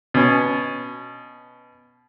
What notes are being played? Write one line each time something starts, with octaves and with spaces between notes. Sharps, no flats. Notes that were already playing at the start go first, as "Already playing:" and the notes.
B2 C#4